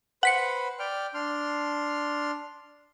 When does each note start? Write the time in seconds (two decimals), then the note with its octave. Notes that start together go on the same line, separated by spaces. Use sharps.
0.23 B4 C5 F#5 B5 B6 C#7
0.79 D5 G5 F6
1.14 D4 C6 F6